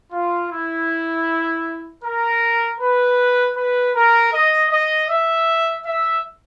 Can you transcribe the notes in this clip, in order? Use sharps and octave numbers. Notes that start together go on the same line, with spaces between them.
F4
E4
A#4
B4
B4
A#4
D#5
D#5
E5
E5